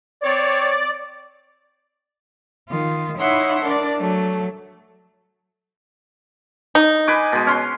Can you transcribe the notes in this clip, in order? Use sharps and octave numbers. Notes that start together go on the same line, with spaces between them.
C4 C#5 D5
D#3 F4
D#4 E4 C#5 E5 F#5 C6
D4 A#4 D5
F#3 A3
D#4
B4 G#5 D6
B2 G#3
C#4 C6